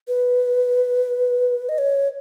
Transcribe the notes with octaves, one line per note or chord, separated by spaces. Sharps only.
B4
D#5
C#5